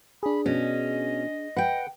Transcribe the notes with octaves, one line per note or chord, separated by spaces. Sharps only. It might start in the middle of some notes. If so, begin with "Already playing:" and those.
D4 G#4 B5
B2 C#4 D#5
B4 F#5 G5